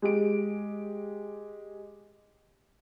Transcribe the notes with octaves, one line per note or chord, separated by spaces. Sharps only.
G#3 G4 D7